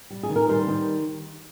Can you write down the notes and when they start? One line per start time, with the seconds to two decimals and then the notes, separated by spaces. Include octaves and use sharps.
0.10 G3
0.23 G#4
0.29 D#3
0.36 A#4
0.49 G3 C5
0.68 D#3